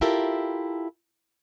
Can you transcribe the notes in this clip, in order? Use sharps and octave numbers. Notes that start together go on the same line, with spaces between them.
E4 F4 G4 A4 A#4 E5